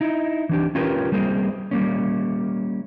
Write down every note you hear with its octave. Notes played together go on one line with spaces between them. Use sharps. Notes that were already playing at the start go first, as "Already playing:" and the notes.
D#4 E4
E3 D4 G4
C#4 F4 G4 A#4 B4
G3 A#3 C4 G#4
G3 A#3 C#4